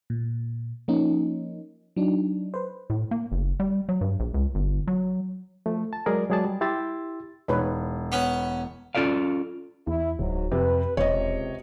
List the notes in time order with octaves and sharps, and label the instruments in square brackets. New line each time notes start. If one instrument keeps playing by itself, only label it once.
[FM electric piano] A#2
F3 A#3 C#4 D#4
F#3 D4 D#4
B4 C5
[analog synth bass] A2
A#3
F#1
G3
F#3
G2
A#1
C#2
G1
F#3
[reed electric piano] F3 A3
A5
F#3 G#3 G#4 A#4 D5
F#3 G#3 G#4 D5 A5
G3
E4 G4 C6 E6 A6
[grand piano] E1 [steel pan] D#4 B4 C#5
[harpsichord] B3 C#4
[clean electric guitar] C#4 F4 A4 D5 F5
[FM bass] E2 [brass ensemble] E4
[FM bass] D1 [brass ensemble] G#2 F#3
[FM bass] F2 [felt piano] C3 [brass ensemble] B4
[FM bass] E1 [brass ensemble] C#2 C3 [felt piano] C#5 D#5